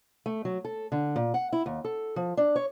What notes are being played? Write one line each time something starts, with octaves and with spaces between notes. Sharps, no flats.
A3
F#3
A4
D3
A#2
F#5
E4
D#2
A4
F3
D4
C#5